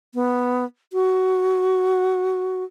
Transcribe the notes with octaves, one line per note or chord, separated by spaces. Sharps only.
B3
F#4